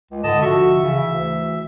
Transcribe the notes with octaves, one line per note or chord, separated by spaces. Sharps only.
C#2
G#2 D3 D#5 A5
C2 D3 F3 F#4 E5
C#3 E3
D2